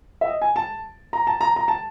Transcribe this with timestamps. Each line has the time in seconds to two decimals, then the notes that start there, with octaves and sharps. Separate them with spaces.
0.21 E5
0.27 D#5
0.42 G#5
0.56 A5
1.13 A#5
1.27 A5
1.41 A#5
1.56 A#5
1.68 A5